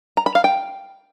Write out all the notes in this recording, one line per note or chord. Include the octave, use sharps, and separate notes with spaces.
A#5
B5
F5
G5